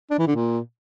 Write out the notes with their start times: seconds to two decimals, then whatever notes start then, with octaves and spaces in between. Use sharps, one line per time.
0.11 D4
0.19 E3
0.27 D3
0.35 A#2